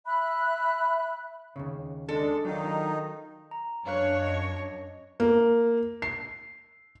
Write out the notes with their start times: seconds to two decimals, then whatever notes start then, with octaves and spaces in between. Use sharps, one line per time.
0.05 E5 B5 F#6
1.56 D#2 A#2 C#3
2.09 G#3 D4 A4
2.45 D#3 F#3 D4 D#4 F4
3.51 A#5
3.87 F#2 D4 C#5 F5 F#6
4.22 D#5
5.20 A#3
6.02 C7